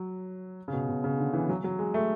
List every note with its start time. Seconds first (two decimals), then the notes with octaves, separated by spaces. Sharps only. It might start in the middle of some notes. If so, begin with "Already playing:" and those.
Already playing: F#3
0.68 C#3
0.73 B2
0.88 B2
1.04 C#3
1.19 D3
1.33 E3
1.49 F#3
1.64 F#3
1.79 G#3
1.94 A3